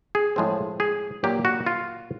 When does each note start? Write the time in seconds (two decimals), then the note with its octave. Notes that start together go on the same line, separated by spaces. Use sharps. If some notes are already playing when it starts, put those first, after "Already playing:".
0.15 G#4
0.36 A2 F3 G#3 C4
0.80 G#4
1.24 A#2 F#3 A#3 G4
1.45 F#4
1.66 F4